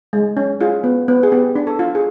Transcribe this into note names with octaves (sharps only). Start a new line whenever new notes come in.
G#3
C#4
F4 G#4
B3
B3
G#4
B3 G4
D4
A4
F4
G#4